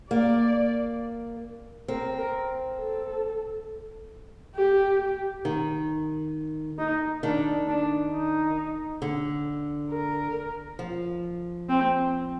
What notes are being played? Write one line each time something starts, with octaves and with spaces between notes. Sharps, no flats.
A#3 D5
C4 A#4
A#4
A4
G4
D#3
D#4
D#3 D4
D4
D#4
D3
A#4
F3
C4